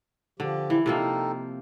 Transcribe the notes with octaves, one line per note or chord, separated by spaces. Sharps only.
D3 F3 G4
E3
C3 F3 A#3 C4 D#4 A4